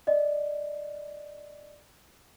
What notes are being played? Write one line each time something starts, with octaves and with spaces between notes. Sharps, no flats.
D5 D#5